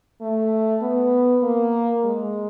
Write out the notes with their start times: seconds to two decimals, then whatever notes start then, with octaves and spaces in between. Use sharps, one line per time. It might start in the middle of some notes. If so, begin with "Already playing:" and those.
0.21 A3
0.82 B3
1.43 A#3
2.04 G#3